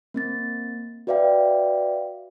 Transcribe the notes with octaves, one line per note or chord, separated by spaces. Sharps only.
A#3 C4 A6
F#4 B4 D5 E5 F5 G5